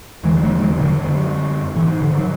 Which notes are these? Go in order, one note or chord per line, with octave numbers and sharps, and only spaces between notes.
E2 D3 E3 G#3
F#3 A3
E3 G#3
D3 F#3
F#2 D3
G#2 E3
D3
F#3